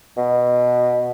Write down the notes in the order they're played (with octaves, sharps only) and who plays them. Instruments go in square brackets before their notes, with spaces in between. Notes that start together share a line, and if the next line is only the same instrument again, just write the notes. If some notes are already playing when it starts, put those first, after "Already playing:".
[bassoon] B2